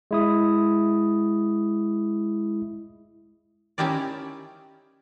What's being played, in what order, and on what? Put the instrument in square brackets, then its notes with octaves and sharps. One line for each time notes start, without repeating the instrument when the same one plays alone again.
[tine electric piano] G#3 E4 D#6
[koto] C#4 D#4 E4 G4 A#4 D5